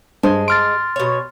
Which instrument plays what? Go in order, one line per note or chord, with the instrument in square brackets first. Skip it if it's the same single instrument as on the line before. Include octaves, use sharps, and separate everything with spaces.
[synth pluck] G2 C5 [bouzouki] G#3 [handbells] A5
[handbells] C6 F6 A6 [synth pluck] D7
[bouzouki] B2 C#5